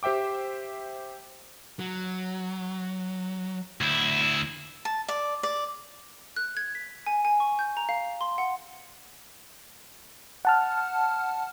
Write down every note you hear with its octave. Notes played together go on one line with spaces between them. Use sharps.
G4 C5 E5 G5 D6
F#3
D2 E4
A5
D5
D5
F#6
G#6
B6
G#5
G#5
C#6
G6
A#5
F5
C6
F#5
F#5 A5 F6